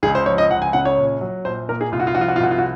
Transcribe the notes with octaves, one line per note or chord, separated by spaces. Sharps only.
C#2 G#4
C5
F3 C#5
D#5
C#2 F#5
G#5
C#3 F#5
C#5
A#1
F#3
A#1 C5
A#2 A#4
G#4
C2 F4
F#4
F4
F3 F#4
F4
F#4
F4
C2 F#4
F4
F#4